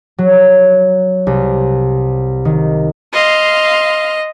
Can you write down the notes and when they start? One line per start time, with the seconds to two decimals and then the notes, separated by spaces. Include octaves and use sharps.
0.18 F#3
1.27 C2
2.45 D#3
3.13 D#5 F5 C6